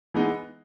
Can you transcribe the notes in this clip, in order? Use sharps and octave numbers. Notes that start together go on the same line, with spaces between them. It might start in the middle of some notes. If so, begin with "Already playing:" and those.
E3 G#3 B3 D#4